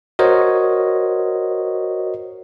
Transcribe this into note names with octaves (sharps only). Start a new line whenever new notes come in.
F#4 A#4 C5 C#5 D#5